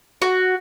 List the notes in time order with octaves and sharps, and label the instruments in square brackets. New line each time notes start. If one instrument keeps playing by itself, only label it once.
[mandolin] F#4